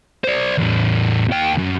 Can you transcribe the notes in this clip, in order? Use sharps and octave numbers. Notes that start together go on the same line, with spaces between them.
C5 D5
E2 A2
D#2 G5
F#2